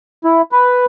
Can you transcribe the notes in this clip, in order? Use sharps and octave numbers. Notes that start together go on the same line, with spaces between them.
E4
B4